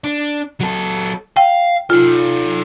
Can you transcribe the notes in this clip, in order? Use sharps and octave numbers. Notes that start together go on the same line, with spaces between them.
D4
F#3 A4
F5 G5
D#4 F4 A4